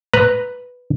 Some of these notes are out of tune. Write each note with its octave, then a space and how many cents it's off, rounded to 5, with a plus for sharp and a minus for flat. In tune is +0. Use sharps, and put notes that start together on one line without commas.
B4 +0 A#5 +0